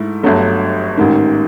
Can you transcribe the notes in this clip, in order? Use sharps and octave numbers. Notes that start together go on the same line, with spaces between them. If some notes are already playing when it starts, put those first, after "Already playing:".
Already playing: G#2 A3 E4
G1 G2 D3 F#3 A3
A1 G#2 D#3